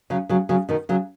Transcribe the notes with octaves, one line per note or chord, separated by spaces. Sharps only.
C#3 F#3
C#3 F#3
C#3 F#3
B2 D#3
C#3 F#3